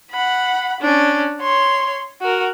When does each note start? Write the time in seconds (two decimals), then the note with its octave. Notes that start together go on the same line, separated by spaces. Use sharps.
0.11 F#5 B5
0.81 C#4 D4
1.41 C#5 C6
2.21 F#4 A#4